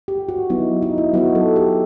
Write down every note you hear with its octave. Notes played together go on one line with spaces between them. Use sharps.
G4
F#4
F#3 B3 D#4 E4
D#4
E4
F#3 B3 D#4 F#4
A4
G4